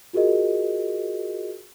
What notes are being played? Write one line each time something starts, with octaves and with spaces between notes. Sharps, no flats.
F4 F#4 G#4 A#4 D#5